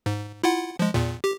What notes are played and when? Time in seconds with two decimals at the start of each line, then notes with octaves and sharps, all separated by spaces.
0.06 G#2
0.44 E4 F4 F#5
0.79 F3 G#3
0.94 E2 A#2
1.24 G4